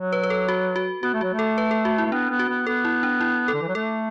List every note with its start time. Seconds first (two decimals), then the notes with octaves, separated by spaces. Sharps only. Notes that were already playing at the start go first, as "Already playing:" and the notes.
Already playing: F#3
0.13 B4
0.24 B4
0.30 A4
0.49 F#4
0.76 F#4
1.03 B3 F#4
1.14 A3
1.21 F#3 F#4
1.33 A3
1.39 A4
1.58 B4
1.71 A4
1.85 F#4
1.98 E4
2.06 A3
2.12 B3 D4
2.30 B3
2.39 F#4
2.49 B3
2.67 B3 A4
2.85 E4
3.03 D4
3.21 E4
3.48 A4
3.54 D3
3.61 E3
3.68 F#3
3.75 A3 A4